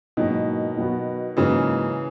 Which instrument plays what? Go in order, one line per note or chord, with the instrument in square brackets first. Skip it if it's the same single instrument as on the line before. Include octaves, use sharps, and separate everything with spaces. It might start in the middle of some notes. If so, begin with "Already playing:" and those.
[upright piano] G#2 F#3 A#3 E4 [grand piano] B2 D#3
[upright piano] B2 F#3 B3 F#4
[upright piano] G#2 F#3 A#3 C#4 [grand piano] C#3 E3